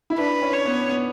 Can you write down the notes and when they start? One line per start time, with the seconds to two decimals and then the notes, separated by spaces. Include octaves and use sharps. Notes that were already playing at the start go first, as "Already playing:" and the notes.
0.10 E4
0.18 D4 B4
0.42 C#4
0.53 C#5
0.66 B3
0.89 B3